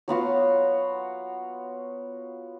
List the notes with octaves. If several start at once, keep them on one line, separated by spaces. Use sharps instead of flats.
F#3 B3 F4 F#4